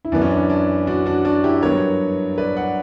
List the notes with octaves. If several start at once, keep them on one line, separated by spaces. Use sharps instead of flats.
E4
F#2 E3 B3 D4
C#4
D4
D4
D4 F#4
D4 F#4
D4 F#4
E4 G4
G2 F#3 B3 A#4 C#5
B4 D5
D5 F#5